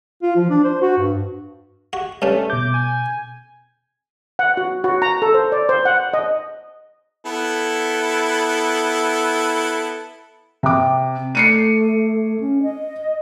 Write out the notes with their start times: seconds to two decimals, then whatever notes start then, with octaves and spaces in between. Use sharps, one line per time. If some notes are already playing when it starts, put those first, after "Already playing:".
0.23 F4
0.36 F3
0.50 D4
0.64 C5
0.81 F#4
0.98 G2
1.93 F#4
2.22 G2 A3 C#4
2.50 B2 D6 G6
2.74 G#5
4.39 F#5
4.57 F#4
4.84 F#4
5.02 A#5
5.22 A4
5.34 C5
5.52 D5
5.69 C5
5.85 F#5
6.14 D#5
7.25 B3 E4 A4
10.63 C3 D6
11.35 A3 C7 C#7 D#7
12.40 C#4
12.63 D#5